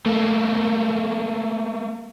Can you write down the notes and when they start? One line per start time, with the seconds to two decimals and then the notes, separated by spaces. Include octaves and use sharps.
0.06 A3 A#3